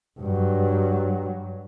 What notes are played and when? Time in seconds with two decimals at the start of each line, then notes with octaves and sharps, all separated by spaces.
0.20 G2 F#3